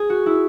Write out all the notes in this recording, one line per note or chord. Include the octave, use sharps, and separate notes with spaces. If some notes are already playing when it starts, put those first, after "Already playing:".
Already playing: G#4
F#4
E4